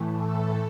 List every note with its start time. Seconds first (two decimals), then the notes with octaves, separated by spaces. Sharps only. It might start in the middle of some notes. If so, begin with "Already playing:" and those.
Already playing: A2 E3 A3
0.16 A4